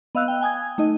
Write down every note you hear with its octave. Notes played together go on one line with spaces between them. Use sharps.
B3 D#5 F5 E6 F#6
G5
G5 G#5 D#6 G#6
A3 D#4 D#5